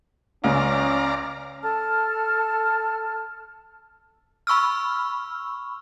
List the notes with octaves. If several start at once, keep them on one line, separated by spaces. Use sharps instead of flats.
C#2 C#3 C#4 D5 F5 A#5
A4 A5 F6
B5 C#6 E6 F6